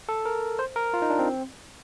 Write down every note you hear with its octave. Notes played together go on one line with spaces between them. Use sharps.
A4
A#4
C5
A#4
F4
D#4
D4
C4